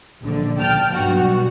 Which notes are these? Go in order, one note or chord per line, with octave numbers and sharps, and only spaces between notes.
A#1 D3
G5 A5 F6
B1 G2 F#4